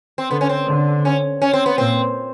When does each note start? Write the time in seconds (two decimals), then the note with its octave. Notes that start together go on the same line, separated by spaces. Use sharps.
0.18 C4
0.30 D3 B3
0.41 C#4
0.49 C4
0.67 D3
1.05 C#4
1.42 C#4
1.53 C4
1.66 B3
1.78 A#2 C4